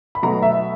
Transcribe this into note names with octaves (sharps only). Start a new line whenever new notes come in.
B5
B2 F#3 A3 A#5
E5